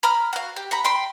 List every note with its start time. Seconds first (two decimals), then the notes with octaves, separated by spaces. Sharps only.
0.03 A#5 B5 F6
0.33 F#4 F5
0.56 G4
0.71 F#5 A#5 B5
0.84 G5 B5 C6